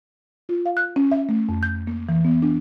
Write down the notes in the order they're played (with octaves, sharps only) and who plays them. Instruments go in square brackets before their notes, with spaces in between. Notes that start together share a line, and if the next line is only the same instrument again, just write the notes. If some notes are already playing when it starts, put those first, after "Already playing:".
[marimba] F4
F5
F#6
C#4
E5
A3
F2
G6
A#3
E3
B3
D4